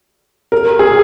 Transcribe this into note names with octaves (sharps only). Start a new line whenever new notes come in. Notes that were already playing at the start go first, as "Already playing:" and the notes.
A#4
G#4